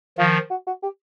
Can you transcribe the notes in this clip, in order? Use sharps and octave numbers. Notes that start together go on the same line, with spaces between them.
D#3 F3 F4
F#4
F#4
G4